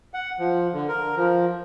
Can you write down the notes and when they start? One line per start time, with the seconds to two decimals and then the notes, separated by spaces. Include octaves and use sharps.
0.14 F#5
0.39 F3
0.73 D3
0.88 A#4
1.16 F3